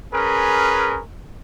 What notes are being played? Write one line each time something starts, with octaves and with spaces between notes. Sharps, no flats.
C#4 G#4 A#4 B4